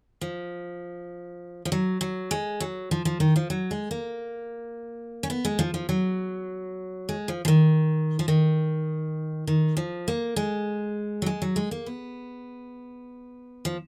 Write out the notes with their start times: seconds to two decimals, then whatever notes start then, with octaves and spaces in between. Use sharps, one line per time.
0.21 F3
1.65 F3
1.72 F#3
2.01 F#3
2.31 G#3
2.60 F#3
2.91 F3
3.05 F3
3.20 D#3
3.36 F3
3.50 F#3
3.71 G#3
3.91 A#3
5.23 C#4
5.30 B3
5.45 G#3
5.59 F3
5.74 F3
5.89 F#3
7.09 G#3
7.28 F3
7.45 F3
7.48 D#3
8.19 F3
8.28 D#3
9.47 D#3
9.77 F3
10.08 A#3
10.36 G#3
11.22 F#3
11.26 G#3
11.42 F#3
11.56 G#3
11.71 A#3
11.86 B3
13.65 F3